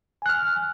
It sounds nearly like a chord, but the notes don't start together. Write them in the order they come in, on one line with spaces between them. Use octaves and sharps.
G#5 F#6 F6